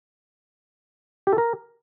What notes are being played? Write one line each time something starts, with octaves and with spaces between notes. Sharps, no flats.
G4
A4
A#4